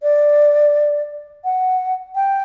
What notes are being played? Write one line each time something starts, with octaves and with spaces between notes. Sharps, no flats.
D5
F#5
G5